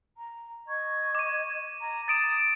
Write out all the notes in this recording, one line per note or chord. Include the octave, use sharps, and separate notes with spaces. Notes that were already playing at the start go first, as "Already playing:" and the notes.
A#5
D#5 C#6 G#6
D6 D#7
A#5
D#6 A6 D7 E7